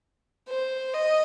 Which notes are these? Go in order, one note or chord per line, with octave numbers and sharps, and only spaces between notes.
C5
D#5